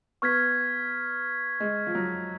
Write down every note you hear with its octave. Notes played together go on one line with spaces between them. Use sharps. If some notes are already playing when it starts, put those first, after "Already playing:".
B3 C#6 F6 G#6 B6
G#3
F3
F#3